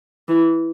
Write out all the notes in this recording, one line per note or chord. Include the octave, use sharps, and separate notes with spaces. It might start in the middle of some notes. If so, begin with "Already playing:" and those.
E3